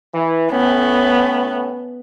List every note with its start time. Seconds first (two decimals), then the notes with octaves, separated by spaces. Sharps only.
0.15 E3
0.51 A2 B3 C#4